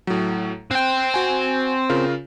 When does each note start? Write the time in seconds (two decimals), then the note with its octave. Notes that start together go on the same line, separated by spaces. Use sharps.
0.07 A2 F#3
0.71 C4 G5 F#6
1.14 F#4 G#5
1.90 C#3 F4 A#4